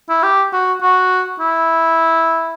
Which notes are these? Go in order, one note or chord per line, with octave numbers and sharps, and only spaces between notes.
E4
G4
F#4
F#4
E4